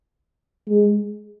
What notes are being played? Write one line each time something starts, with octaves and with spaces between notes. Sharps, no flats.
G#3